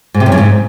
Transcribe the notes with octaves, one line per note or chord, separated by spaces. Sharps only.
G#2
C3
F#2
C#3
G#2